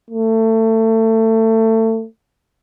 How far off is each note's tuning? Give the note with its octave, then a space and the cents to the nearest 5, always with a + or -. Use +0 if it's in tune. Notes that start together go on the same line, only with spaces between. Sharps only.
A3 +25